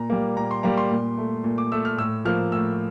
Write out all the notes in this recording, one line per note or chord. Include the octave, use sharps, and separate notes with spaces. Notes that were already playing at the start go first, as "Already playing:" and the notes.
Already playing: A#2 A#5
G3 A#3
A#2 A#5
C6
G3 A#3 A#5
C6
A#2
A3
A#2
D6
A3 E6
F6
A2 E6
F3 A#3 F6
A2 E6